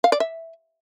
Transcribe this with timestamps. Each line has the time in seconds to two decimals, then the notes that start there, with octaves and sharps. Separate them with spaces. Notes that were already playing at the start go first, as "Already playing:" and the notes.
0.04 F5
0.12 D5
0.20 E5